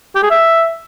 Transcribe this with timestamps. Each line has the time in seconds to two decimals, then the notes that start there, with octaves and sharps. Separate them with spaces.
0.16 G4
0.23 G#4
0.31 E5